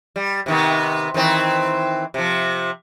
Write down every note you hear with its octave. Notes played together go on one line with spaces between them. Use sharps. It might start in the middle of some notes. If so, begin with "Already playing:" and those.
G3
C3 D#3 B3
D#3 E3 C4
C3 F3